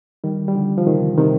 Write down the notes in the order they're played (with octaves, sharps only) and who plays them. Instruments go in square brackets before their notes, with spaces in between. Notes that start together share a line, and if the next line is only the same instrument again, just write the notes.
[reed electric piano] D#3 G3
G3
D3 F3
F3
C3 D#3
C3 D#3